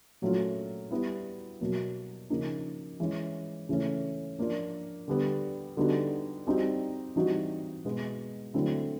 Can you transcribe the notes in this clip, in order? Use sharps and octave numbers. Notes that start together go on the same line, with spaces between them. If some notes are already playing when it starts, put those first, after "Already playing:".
A#2 F#3 A3 C#4 F4
G3 B3 E4
B2 F#3 A#3
C#3 F3 A#3 D#4
E3 G#3 C#4
C#3 E3 A3 C#4
F3 A#3 D4 F4
D3 G3 B3
D3 G3 B3 D#4 F#4
G3 C4 D#4 F#4
E3 G3 C4 D#4 F#4
B2 G#3 B3
D3 F#3 A3 C4 E4